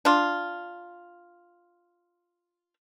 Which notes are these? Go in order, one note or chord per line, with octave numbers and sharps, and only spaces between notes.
D4 F4